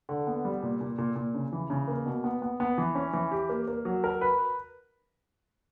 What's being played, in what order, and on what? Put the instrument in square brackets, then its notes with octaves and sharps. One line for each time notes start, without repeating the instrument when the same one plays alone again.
[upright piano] D3
B3
G3
A#2
A#2
A#2
A#2
C#3
E3
C#3
A#3
B2
B3
B3
B3
E3
C#4
E3
G4
A#3
A#3
F#3
A#4
B4